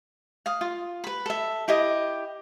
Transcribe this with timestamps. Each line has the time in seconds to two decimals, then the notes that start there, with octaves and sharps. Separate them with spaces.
0.46 F5 D#6
0.61 F4
1.04 B4 B5
1.26 A4 E5
1.68 E4 G4 D#5 D#6